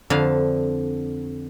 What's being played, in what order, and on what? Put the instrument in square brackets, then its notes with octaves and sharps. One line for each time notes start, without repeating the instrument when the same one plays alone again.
[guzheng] F2 D3 F5